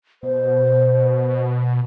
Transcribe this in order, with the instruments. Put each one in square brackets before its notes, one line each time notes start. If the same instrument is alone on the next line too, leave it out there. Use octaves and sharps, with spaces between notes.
[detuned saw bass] B2 [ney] C5